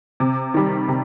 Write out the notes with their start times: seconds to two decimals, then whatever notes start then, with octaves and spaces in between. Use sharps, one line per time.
0.20 C3
0.54 D#3 G3
0.88 C3